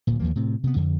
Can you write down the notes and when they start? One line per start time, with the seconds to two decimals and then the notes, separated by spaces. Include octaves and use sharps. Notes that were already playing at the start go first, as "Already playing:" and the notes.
0.07 D1 A#2
0.20 D#2 F3 A#3
0.36 A2 C3 C4
0.64 C3 B3
0.76 F2 D3